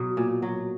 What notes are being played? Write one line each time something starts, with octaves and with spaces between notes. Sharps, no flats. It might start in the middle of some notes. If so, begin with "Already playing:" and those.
Already playing: B2 F#3
A#2
F#3